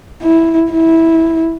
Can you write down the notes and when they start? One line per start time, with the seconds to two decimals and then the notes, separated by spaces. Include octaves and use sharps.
0.23 E4
0.72 E4